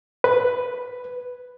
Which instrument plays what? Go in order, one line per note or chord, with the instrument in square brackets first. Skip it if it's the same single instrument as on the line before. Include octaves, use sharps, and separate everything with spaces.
[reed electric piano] B4